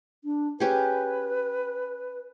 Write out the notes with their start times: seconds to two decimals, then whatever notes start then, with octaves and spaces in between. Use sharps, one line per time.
0.24 D4
0.60 C#4 G4 G#4 B4